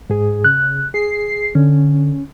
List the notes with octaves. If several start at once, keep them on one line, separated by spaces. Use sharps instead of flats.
G#2 G#4
C#3 F#6
G#4 C7
D3 C#4